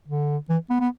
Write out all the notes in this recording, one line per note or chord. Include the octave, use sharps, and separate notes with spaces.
D3
E3
B3
B3